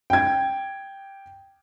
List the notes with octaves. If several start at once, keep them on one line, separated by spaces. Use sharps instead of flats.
G5 G#6